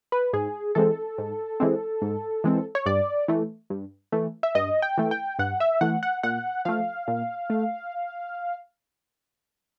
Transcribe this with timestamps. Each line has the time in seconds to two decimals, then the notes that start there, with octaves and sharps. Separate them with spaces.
0.12 B4
0.33 G#2 G#4
0.75 E3 G#3 C4 A4
1.18 G#2
1.60 E3 G#3 C4
2.02 G#2
2.44 E3 G#3 C4
2.75 C#5
2.86 G2 D5
3.28 E3 A3
3.70 G2
4.12 E3 A3
4.43 E5
4.55 G2 D#5
4.82 G5
4.98 E3 A3
5.11 G5
5.39 G2 F#5
5.60 E5
5.81 E3 A3 F#5
6.03 F#5
6.23 A#2 F#5
6.65 F3 A3 F5
7.08 A#2
7.50 A3